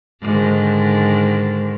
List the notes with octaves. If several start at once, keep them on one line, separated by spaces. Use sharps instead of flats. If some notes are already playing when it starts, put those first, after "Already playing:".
G#2 D3 D#3